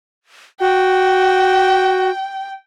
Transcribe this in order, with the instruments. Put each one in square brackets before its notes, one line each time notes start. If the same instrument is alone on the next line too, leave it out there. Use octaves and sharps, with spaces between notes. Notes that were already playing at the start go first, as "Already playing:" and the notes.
[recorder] F#4 [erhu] G5